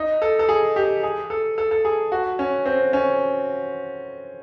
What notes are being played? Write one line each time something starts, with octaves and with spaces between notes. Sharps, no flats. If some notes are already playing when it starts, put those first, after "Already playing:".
Already playing: D#4
A4
A4
G#4
G4
G#4
A4
A4
A4
G#4
F#4
C#4
C4
C#4